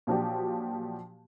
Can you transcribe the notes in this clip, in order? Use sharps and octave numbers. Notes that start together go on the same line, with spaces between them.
A#2 F3 F#3 D4 F#4 G4